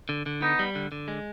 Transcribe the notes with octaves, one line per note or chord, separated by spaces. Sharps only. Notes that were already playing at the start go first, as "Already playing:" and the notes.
D3
D3
B3 D#4
G3
D3
D3
G#3